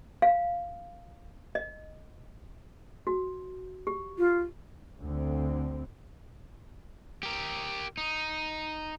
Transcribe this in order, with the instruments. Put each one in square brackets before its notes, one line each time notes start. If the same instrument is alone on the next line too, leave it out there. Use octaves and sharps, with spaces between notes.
[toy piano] F5
D#5
F#4
G4
[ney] F4
[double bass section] D2 D3 C4
[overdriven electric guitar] G4 A#4
D#4